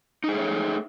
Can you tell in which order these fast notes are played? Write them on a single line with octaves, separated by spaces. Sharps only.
D#4 G#4 A3 C#5